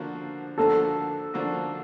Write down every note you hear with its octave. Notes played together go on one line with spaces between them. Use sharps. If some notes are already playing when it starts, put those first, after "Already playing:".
Already playing: D3 F3 A#3 D4 F#4
D3 F3 A#3 D4 F#4 A4
D3 F3 A#3 D4 F#4